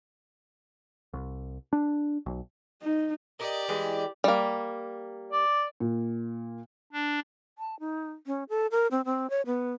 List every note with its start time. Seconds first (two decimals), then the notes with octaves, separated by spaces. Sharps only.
1.13 C2
1.73 D4
2.26 B1
2.82 D#4
3.40 G4 A#4 D5 D#5
3.69 E3 G3 G#3
4.24 G3 A#3
5.32 D5
5.80 A#2
6.93 D4
7.59 A5
7.80 D#4
8.27 C#4
8.49 A4
8.71 A#4
8.91 C4
9.05 C4
9.30 C#5
9.46 B3